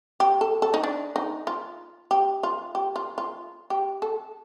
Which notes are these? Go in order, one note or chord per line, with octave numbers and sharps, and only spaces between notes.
G4
A4
A4
D#4
D4
D#4
F4
G4
F4
G4
F4
F4
G4
A4